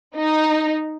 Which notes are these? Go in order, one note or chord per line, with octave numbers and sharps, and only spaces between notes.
D#4